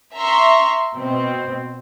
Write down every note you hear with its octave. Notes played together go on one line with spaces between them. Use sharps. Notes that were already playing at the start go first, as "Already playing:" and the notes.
E5 A#5 C6 C#6
B2 C4